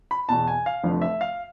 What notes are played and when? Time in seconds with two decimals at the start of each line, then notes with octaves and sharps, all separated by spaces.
0.11 B5
0.29 E2 B2 A5
0.47 G#5
0.66 F5
0.83 F1 F2 D3 F3
1.02 E5
1.21 F5